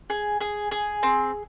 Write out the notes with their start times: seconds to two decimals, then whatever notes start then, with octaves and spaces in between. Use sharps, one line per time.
0.10 G#4
0.40 G#4
0.71 G#4
1.03 C4